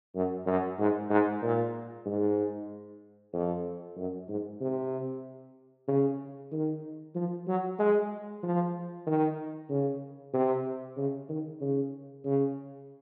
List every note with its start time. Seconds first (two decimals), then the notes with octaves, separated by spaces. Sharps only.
0.15 F#2
0.47 F#2
0.79 G#2
1.10 G#2
1.42 A#2
2.06 G#2
3.33 F2
3.97 F#2
4.29 G#2
4.61 C3
5.88 C#3
6.52 D#3
7.15 F3
7.47 F#3
7.79 G#3
8.43 F3
9.06 D#3
9.70 C#3
10.34 C3
10.97 C#3
11.29 D#3
11.61 C#3
12.25 C#3